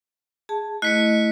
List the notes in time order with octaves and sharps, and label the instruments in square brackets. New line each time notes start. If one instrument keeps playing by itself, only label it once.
[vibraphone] G#4 A5
[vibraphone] A3 E4 D#5 [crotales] F#6 B6 C#7